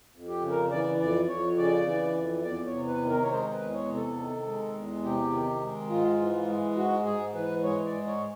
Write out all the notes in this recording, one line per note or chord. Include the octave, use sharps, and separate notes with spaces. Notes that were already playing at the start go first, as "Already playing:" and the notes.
F2
G4
C#3
A#4
E3 D5
F2 D5
F2 C#5
C#3 D5
E3
F2
E2 D5
C#5
C3
B4
D#3
A#4
C#5
G#3 C5
B4
E2
C#5
C3
A4
D#3
G#3
E2
C3 G4
D#3
G#3
G#2 F4
E3
G#3
G#2 F#4
G#2 G#4
E3 B4
G#3 C#5
D5
G#2
C#5